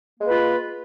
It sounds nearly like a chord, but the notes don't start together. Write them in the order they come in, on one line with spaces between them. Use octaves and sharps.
A#3 G#3 B4 F4